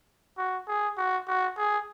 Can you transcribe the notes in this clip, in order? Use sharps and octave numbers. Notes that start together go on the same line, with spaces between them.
F#4
G#4
F#4
F#4
G#4